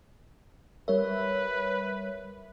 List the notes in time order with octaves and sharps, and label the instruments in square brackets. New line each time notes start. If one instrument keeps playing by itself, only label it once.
[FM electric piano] G3 C#5 E5 [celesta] A#4 [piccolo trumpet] B4